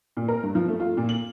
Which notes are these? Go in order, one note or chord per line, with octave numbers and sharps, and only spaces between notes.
A#2
A#4
G2
F3
A3
F4
A#2
F#7